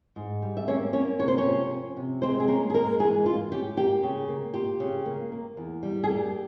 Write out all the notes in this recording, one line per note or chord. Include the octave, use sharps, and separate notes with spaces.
G#2
G3
E5
A#3 C#4 C#5
A#3 C#4 C#5
C3 C#5
C5
C#4 C#5
F3
C#4
C3
G#3 C4 C5
G#4
A#3 C#4 A#4
G#4
G#3 A#3 A#4
E3 G#3 G#4
E3 F4
C#4 G4
A#3 G4
C#3
A#3
F4 G4
C#3
A#3
A#3
E2
G3
G#4
A#3 G4